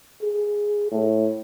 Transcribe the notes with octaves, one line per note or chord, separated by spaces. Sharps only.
G#4
A2